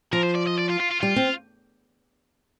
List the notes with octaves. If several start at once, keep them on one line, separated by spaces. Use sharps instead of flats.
F3 A#4
C5
D5
D#5
D5
F4
F4
F4
G3 F4
C4